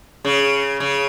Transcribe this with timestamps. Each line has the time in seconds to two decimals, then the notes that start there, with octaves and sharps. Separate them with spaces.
0.25 C#3
0.80 C#3